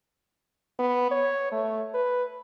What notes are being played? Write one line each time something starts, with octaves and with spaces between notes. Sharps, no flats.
B3
C#5
A3
B4